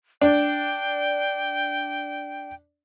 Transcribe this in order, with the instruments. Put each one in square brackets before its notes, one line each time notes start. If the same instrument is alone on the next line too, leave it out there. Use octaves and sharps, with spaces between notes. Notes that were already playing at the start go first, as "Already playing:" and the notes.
[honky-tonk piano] D4 [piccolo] G5